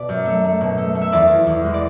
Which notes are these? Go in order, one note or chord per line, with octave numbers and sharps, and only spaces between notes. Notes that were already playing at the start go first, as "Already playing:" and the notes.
Already playing: B2 B4 D5
F#2
A3
A3
B2
A3
A3
E5
E2 B4 D5
E2
E2
G#3
D5